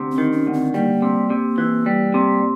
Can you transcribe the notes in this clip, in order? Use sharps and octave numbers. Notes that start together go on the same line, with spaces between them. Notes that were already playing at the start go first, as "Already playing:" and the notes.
Already playing: D2 C3
C4
D#3
C#4
D2
C4
G3 A#3
C3
C3
E3
G3
C3